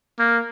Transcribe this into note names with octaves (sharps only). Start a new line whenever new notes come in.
A#3